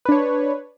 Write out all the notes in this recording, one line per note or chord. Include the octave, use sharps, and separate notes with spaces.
D4 B4 C#5